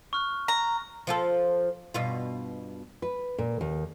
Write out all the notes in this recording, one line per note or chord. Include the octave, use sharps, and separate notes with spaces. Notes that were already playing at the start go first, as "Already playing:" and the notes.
C#6 F6 F#6
A#5
F3 F4 A4
G2 B2 F4
B4
A#2
D#2